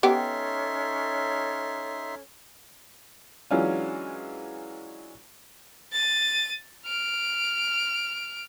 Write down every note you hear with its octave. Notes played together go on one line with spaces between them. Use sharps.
B3 C#4 D#4 G4 A4 C#5 E5 C6
E3 F#3 G#3 C#4 D4 F4
A6 D#7
F6 D7